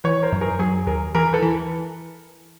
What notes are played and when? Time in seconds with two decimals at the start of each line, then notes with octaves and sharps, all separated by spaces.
0.04 E3 B4 C#5
0.23 A#4 C5
0.32 F#2
0.41 G#4 A#4
0.59 F#3 G#4
0.87 D#2 G#4 A#4
1.15 E3 G#4 A#4
1.33 A4 B4
1.42 E3